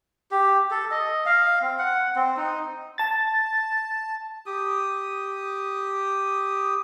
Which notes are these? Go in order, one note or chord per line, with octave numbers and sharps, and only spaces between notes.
G4
A4
D#5
F5
C4
F#5
C4
D#4
A5 A6
G4 D#6